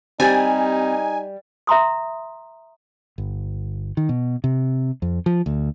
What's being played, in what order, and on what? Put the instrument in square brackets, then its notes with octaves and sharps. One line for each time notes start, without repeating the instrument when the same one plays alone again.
[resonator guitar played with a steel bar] G3 [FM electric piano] C4 G4 [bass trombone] D#4 [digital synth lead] G#5
[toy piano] E5 A#5 C6 D#6
[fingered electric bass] G1
D#3
B2
C3
F2
F3
D2